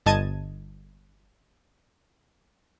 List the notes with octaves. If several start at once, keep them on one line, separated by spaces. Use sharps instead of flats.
G1 D#5 A5 G#6 D#7